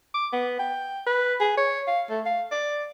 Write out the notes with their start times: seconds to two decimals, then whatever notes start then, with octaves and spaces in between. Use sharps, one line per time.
0.14 D6
0.33 B3
0.59 G5
1.07 B4
1.41 G#4
1.58 C#5
1.88 F5
2.10 A3
2.26 F5
2.52 D5